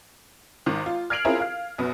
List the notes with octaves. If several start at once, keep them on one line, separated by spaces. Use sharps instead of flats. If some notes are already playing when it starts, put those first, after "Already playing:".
G#1 D#3
F4
F6 G#6 C7 D7 F7 F#7
C4 C#4 E4 F4 G#4 A#4
F5 F6
F#2 B2 B3